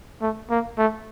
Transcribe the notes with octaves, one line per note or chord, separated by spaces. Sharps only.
A3
A#3
A3